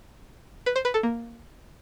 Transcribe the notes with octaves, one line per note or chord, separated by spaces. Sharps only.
B4
C5
B4
A4
A#3